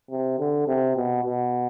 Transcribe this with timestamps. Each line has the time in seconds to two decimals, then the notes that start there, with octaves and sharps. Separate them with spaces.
0.11 C3
0.39 D3
0.68 C3
0.96 B2
1.24 B2